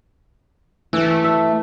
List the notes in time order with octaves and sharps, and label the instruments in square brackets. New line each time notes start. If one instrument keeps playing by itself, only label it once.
[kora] E3 [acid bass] A3
[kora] E5